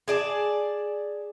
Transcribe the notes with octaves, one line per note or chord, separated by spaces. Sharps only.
G#4 D5 A5